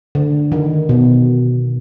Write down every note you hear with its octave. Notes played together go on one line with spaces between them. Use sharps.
D3
D#3
B2